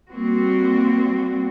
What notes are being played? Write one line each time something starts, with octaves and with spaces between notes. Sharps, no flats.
G3 A#3 C4 F#4